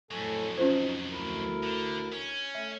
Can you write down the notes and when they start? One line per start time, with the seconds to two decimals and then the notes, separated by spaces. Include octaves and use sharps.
0.11 F2 A2 F#3 A4 G#5
0.58 C#4 D#4 F4 C5
1.10 D2 E4 A#4
1.64 D3
2.13 C#4
2.55 A3 E5